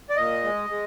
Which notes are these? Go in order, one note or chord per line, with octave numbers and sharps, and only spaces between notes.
D5
A#2 D#5
G#3
G#3